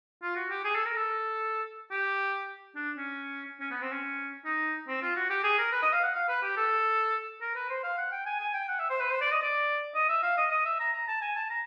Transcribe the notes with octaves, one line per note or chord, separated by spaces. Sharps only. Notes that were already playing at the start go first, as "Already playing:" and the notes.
F4
F#4
G4
G#4
A4
A#4
A4
G4
D4
C#4
C#4
B3
C4
C#4
D#4
C4
F4
F#4
G4
G#4
A#4
B4
D#5
F5
F#5
F5
B4
G4
A4
A#4
B4
C5
F5
F#5
G5
G#5
G#5
G5
F#5
E5
C5
B4
C5
D5
D#5
D5
D#5
E5
F5
D#5
D#5
E5
A#5
A#5
A5
G#5
A5
A#5